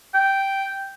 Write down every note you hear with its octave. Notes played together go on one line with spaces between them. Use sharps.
G5